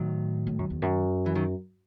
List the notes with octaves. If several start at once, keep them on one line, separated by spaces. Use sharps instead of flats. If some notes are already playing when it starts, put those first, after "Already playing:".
Already playing: A2 D#3 F#3
A2
F#2
E2
F#2
E3
D#3 F#3